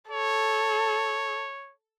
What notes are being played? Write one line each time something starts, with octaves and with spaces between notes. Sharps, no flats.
A4 C#5